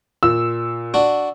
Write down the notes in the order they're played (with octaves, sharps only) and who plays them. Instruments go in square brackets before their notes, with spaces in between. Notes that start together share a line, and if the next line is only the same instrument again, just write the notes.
[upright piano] A#2 E6
[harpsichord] D4 F#4